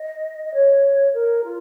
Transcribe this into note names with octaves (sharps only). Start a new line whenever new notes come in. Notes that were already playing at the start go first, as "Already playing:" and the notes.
Already playing: D#5
D#5
C#5
A#4
F4